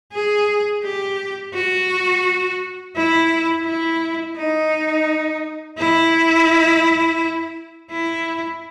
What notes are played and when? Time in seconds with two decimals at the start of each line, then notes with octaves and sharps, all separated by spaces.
0.12 G#4
0.83 G4
1.54 F#4
2.96 E4
3.65 E4
4.37 D#4
5.78 E4
7.90 E4